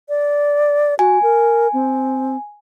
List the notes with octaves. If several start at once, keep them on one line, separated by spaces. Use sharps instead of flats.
D5
F#4 G#5
A#4
C4